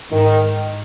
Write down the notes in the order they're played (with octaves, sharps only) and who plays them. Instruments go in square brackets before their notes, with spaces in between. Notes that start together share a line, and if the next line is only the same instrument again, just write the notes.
[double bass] G#2 [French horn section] D#3